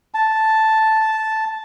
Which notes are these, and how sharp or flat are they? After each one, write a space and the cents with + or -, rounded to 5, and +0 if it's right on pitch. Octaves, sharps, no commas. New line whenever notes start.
A5 -5